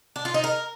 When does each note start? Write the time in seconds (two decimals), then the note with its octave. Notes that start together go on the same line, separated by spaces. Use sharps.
0.16 D4
0.25 F4
0.34 D#4
0.44 A#4